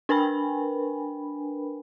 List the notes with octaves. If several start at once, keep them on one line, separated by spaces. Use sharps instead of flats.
D4 A#4 B4 G5 G#5 B5